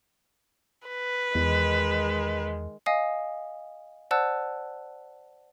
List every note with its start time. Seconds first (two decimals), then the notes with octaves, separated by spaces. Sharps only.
0.88 B4
1.35 E2 D#3 G#3
2.86 D#5 F5 G#5 D#6
4.11 C5 D5 F#5 A5 E6 F#6